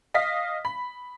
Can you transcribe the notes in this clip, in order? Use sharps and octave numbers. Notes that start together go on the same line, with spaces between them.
D#5 F5 B6
B5